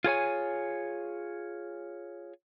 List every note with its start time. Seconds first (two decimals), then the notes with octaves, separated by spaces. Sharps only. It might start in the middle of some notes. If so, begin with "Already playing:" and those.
0.04 F4 G#4 C#5 G#5